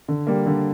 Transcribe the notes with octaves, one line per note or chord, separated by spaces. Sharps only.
D3
G3 A#3
D3